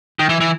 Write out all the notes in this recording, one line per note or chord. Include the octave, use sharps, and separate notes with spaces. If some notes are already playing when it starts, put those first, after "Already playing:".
D#3
E3
E3